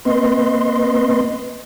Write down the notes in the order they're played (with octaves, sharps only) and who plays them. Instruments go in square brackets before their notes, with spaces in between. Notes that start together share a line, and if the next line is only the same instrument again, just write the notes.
[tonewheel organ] A#3 C4 B4 D#5 C6